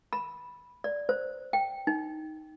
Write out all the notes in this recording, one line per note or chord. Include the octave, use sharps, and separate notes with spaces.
B5
D5
C5
G5
D#4